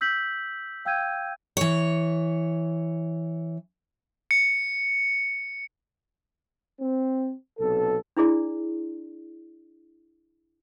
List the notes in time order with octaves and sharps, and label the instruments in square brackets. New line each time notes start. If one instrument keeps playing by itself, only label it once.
[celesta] E6 G6 B6 F#7
F5 G5 E6 G6 G#6 D#7
[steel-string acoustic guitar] E3 C#5
[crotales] C#7
[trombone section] C4
B1 C3 A4
[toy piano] D4 E4 G#4 D5